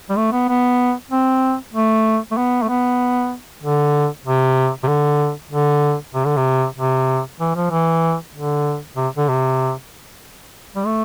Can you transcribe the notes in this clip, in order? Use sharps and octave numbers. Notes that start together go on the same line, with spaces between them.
G3
A3
B3
B3
C4
A3
A3
B3
A3
B3
D3
C3
C3
D3
D3
C3
D3
C3
C3
E3
F3
E3
D3
C3
D3
C3
G3
A3